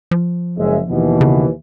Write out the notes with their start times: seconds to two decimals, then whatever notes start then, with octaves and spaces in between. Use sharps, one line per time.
0.11 F3
0.58 F#1 G#3 E5
0.89 D#2 B2 E3
1.21 C#3